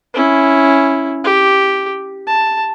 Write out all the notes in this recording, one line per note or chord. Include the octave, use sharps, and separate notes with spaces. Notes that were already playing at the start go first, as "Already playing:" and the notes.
C#4 E4
G4
A5